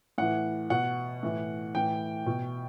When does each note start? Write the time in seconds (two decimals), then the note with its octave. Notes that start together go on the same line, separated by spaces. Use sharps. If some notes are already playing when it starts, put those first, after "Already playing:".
0.18 A2 E3 F#5
0.70 B2 F#5
1.23 A2 E3
1.74 A2 E3 G5
2.26 B2